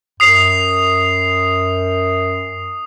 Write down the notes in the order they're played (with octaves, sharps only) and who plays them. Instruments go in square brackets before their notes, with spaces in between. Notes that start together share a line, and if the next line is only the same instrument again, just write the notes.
[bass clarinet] F#2 [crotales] D#6 C7 F7